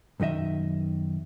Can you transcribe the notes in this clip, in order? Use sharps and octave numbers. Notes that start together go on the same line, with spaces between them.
B1 F#2 D#3 D#5 E5